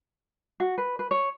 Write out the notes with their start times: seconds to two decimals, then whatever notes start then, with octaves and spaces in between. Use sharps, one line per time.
0.60 F#4
0.78 B4
0.99 B4
1.11 C#5